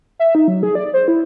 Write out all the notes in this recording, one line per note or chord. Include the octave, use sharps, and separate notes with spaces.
E5
D#4
F#3
G#4
D5
C5
E4